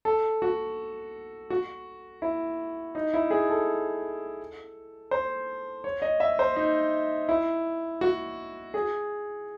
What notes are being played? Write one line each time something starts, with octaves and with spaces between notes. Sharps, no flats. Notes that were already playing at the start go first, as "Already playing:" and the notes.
A4
F#4
F#4
E4
D#4
E4
G#4
A4
C5
C#5
D#5
E5
C5
D#4
E4
F#4
G#4